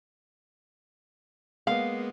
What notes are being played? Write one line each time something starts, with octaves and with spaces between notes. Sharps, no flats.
G#3 A#3 B3 F5